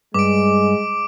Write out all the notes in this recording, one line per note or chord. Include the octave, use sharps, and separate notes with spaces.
G2 G#3 D6 D7